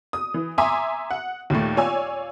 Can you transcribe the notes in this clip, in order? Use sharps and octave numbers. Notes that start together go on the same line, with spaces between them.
D#6
E3
E5 G#5 A#5 C6 D6 D#6
F#5
D#2 A#2 A3
F4 C#5 D5 G#5 E6